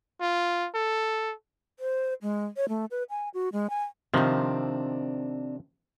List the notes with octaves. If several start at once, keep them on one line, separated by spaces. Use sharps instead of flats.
F4
A4
C5
G#3
C#5
A3
B4
G#5
F#4
G#3
G#5
C3 D#3 F3 C4 D4